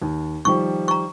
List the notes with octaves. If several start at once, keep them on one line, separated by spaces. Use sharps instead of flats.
D#2
D#3 F3 G3 C#6
A#5 C#6